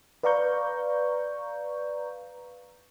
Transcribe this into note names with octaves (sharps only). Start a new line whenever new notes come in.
B4 D5 F5 A#5 C#6 G6